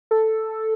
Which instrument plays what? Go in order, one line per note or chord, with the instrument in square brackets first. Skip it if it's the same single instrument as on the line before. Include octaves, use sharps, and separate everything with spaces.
[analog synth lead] A4